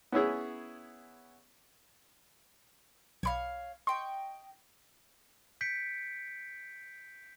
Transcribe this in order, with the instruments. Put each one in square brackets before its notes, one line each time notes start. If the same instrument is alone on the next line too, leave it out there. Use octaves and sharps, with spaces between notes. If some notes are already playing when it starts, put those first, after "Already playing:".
[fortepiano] B3 C#4 E4 G#4
[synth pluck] B1 B5 [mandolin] C#5 D5 F5
[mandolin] D#5 G5 C#6 [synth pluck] C6
[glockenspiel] G6 B6 C#7 D7